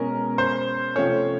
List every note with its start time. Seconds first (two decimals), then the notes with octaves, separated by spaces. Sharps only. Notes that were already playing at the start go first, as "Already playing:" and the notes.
Already playing: B2 G#3 C#4 A#4
0.38 C5
0.96 C3 F3 A3 C#4 C#5